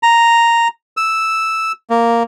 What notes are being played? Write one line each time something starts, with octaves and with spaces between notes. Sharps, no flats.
A#5
E6
A#3